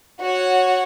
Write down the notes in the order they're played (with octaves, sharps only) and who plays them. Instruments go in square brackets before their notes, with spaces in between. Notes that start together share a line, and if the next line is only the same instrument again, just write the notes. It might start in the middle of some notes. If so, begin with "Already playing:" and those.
[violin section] F#4 C#5 F#5